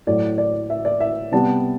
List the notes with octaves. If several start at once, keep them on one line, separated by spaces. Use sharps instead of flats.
A2 F#3 A3 D5
D5
E5
D5
E5
C3 G3 B3 A5